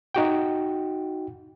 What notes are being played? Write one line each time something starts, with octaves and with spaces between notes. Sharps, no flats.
D#4 F#4 G5